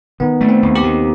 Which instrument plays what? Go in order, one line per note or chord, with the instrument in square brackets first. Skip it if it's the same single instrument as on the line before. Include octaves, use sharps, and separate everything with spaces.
[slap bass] D#3 [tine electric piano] B3
[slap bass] A3
[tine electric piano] C4
[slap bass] D#2
[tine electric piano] G4
[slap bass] D#3